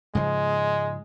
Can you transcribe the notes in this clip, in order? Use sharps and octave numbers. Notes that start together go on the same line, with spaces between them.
G#2 C#3 F3 G#3